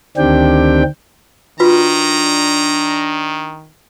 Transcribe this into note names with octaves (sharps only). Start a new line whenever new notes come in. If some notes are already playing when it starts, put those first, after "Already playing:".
D2 D#3 C4 D4 G4 G5
D#3 D4 F4 F#4 B4 A#5